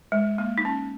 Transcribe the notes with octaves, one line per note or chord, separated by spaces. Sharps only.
G#3
A#3
D#4
C#4